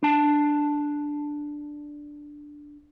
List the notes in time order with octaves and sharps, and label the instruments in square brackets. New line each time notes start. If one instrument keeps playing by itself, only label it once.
[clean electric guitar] D4 A5